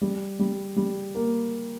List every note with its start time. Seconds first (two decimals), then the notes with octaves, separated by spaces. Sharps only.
0.01 G3
0.39 G3
0.76 G3
1.15 A#3